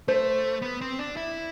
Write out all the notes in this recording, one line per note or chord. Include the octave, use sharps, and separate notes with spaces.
A3 C5
B3
C4
D4
E4